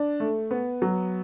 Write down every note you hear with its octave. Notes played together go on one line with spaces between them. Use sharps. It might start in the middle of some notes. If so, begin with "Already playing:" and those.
Already playing: D4
A3
B3
F#3